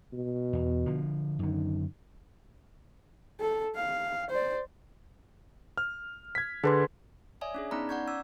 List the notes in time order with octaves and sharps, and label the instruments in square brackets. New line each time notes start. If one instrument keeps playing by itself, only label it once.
[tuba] B2
[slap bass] E2
D3 F3
[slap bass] F#2 D3 [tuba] D#3
[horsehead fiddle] A4
F5
C5 D5
[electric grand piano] F6
G#6 B6
[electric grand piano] D3 D4 [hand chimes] G#4 B4 C6
[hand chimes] C#5 D5 E5 G#5 D#6
C#4 D4 G#4
B3 C#4 D#4 D5 A#5 B5
D5 F#5 A#5 C#6 G6 G#6
C#4 E6 G#6